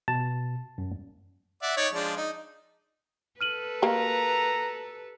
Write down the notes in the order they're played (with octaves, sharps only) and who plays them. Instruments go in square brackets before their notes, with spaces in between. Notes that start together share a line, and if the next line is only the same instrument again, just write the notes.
[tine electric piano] B2 [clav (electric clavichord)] A5
[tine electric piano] F#2
[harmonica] D5 E5 F#5
D#4 C#5 D5
F3 G#3 D4
D#4
[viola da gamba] A4 B4 [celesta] F6 D#7 F#7
[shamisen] A#3 A#4 [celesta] F#4 G4 [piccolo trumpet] A#5